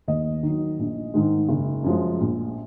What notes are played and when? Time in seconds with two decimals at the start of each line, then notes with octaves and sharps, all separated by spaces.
0.08 D#2 D#5
0.43 D#3 F#3
0.79 A#1
1.14 G#2 D#3 G#3
1.49 F#1
1.84 F#2 F3 G#3
2.21 A#1